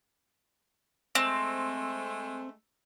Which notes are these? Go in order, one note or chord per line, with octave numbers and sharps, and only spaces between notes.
G#3 A3 C4